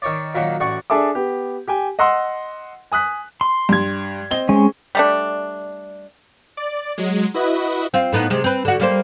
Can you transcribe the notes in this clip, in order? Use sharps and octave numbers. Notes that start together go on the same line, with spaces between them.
D#3 C#5 D5
A#2 D#3 F#3
A1 F#4 D5 G#5 C#6
D4 G#4 A4 E5 D6
B3 G4
G4 G5 G#5
D#5 F#5 C6 E6
G#5 D#6 F#6 B6
C6
G2 G#6
C4 D#5 G7
G#3 C#4
G3 A3 D4
D5
F#3 G#3
E4 F#4 B4 D#5
C4 F4
A2 B3 D#4
C3 G#3
C4 B4
D3 F#4
G3 A#3 C5